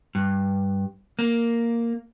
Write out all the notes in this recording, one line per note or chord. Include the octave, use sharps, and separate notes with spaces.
G2
A#3